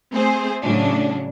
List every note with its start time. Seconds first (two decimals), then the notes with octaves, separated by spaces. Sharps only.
0.13 A3 C4 G#4 C5
0.61 A2 C#3 F#3 D4